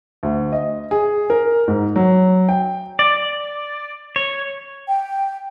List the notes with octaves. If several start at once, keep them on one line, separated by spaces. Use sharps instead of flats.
D2
D#5
G#4
A#4
G#2
F#3
G5
D5
C#5
G5